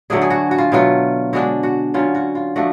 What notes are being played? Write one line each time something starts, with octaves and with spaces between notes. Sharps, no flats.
D3 F#3 A3 D4 G#4
G#4
F#4
F#4
F4
B2 F#3 A3 F4
D3 G#3 D4 F#4
F#4
D3 F#3 C#4 F4
F#4
F4
F3 A3 D4 F#4